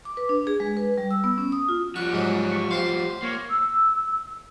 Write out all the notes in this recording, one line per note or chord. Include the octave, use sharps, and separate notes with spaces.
D6
B4
D4
G#4
G#3
B4
G3
E6
B3
C#4
D#6
F4
F3 G3 F#5 C#6
G#2 F#3
C#6
G4 C5 F5 C6
A#3 C#5
E6